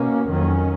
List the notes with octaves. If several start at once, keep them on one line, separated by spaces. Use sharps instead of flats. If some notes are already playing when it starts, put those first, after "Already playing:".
Already playing: B2 A#3 C#4
F2 D#3 F#3 C#4